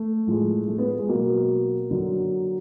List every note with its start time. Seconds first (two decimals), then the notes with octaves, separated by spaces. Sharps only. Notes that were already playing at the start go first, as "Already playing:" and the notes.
Already playing: A3
0.27 A2 F3 G#3
0.68 A3
0.79 B3
0.99 G#3
1.09 B2 F#3 A#3
1.91 D3 F#3